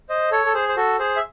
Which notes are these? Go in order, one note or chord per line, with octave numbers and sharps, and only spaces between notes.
C5 D#5
A4 C#5
A4
G#4 C5
C5
F#4 A4
G#4 C5
E5